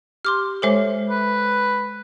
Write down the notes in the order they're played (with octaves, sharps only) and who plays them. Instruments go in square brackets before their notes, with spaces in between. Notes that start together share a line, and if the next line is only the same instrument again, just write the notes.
[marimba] G4 [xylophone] C6 D6 F6
[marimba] G#3 C#5 D6 [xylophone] A4 C5 E5
[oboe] B4